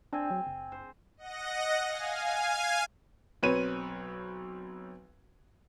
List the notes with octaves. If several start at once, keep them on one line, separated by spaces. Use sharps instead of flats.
C4 D4 G#5
F#3
F#1
C5
D#5 F#5 A#6
F5 G#5
B1 C4 B4 C#5 D#7